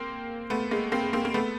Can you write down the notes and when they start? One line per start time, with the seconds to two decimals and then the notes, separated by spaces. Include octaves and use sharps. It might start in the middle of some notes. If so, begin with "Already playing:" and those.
Already playing: A#3 C4
0.50 A3 B3
0.71 G#3 A#3
0.92 A#3 C4
1.13 A#3 C4
1.25 A#3
1.34 A3 B3